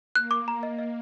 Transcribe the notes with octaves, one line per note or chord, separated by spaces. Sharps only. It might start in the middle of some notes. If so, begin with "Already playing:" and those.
A#3 F#6
D6
A#5
D#5
D#5